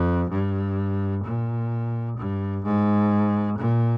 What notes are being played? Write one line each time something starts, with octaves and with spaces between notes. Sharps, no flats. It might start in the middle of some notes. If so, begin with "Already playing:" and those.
Already playing: F2
G2
A#2
G2
G#2
A#2